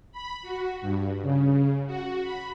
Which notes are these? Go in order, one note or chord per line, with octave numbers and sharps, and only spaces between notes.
B5
F#4
G2
C#3
F#4
B5